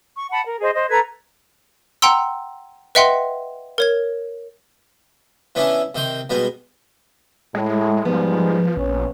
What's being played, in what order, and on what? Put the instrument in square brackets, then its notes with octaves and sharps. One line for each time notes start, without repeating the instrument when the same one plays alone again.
[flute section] C#6
F#5 A5 B5
A#4
G#4 C5 D#5
C5 D#5
A4 B4 A#5 G#6
[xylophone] F#5 G5 A#5 C6 E6
B4 D#5 E5 F#5 G5 C6
A#4 C#5 G#6
[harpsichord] E3 B3 C#4 D4 E4
C3 D#3 G5 C6
B2 G3 G#3 B3
[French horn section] A2 [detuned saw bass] G#3
[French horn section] G#2 G3 G#3 [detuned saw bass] F3 [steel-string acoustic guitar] B3
[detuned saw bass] A#1 [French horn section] C#4